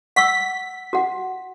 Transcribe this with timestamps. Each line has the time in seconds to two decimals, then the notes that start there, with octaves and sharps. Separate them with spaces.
0.16 F#5 C#6 E6 B6
0.93 F#4 F#5